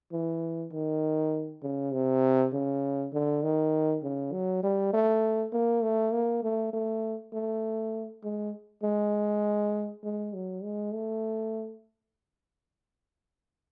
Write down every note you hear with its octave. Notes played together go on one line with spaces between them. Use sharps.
E3
D#3
C#3
C3
C#3
D3
D#3
C#3
F#3
G3
A3
A#3
A3
A#3
A3
A3
A3
G#3
G#3
G#3
F#3
G#3
A3